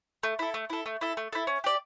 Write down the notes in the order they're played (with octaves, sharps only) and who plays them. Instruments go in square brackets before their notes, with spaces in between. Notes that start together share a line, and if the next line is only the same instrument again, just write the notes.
[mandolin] A3
E4 A4
A3
E4 A4
A3
E4 A4
A3
E4 A4
C#4
G4 D5